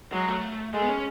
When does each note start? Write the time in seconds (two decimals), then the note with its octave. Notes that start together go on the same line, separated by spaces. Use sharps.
0.12 F#3 G#3
0.28 A3
0.73 G#3 A3
0.82 B3
0.89 C#4